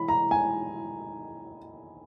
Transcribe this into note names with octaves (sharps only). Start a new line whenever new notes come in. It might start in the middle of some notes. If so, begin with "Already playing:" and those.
Already playing: E3 B5
A#5
G#5